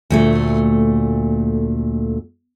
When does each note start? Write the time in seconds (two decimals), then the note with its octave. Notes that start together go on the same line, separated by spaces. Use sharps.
0.10 D2 A#2 A3